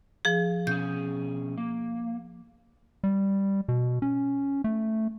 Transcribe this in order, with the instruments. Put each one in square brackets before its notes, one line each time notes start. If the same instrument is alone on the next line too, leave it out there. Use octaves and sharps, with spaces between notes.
[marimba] F3 G#4
[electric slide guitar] B2 C#4 G#4 [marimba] G6
[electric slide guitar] A#3
[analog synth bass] G3
B2
C#4
A3